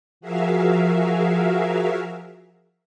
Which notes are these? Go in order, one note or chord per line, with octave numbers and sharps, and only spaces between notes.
F3 F#4 G#4 A#4 E5 F5